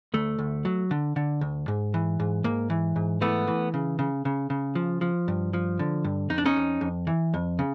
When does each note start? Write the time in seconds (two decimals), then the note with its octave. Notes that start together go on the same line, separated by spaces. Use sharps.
0.14 D2 A3
0.39 D2
0.65 F#3
0.91 D3
1.16 D3
1.41 D2
1.68 G#2
1.94 E3
2.20 G#2
2.44 G#2 A#3
2.70 E3
2.96 G#2
3.21 E3 A3 B3
3.48 E3
3.74 C#3
3.99 C#3
4.25 C#3
4.50 C#3
4.75 F3
5.01 F3
5.28 G2
5.53 F3
5.79 D3
6.04 G2
6.30 F2 D#4
6.38 D4
6.46 C#4 D#4
6.56 F2
6.81 F2
7.07 E3
7.34 F2
7.59 C#3